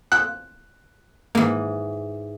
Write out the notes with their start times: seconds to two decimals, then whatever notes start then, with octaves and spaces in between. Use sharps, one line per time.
0.12 F#5 E6 F#6 G6
1.35 G#2 E3 A#3